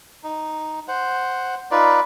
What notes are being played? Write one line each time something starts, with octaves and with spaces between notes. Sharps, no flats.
D#4
C5 F#5
D#4 F4 B4 D5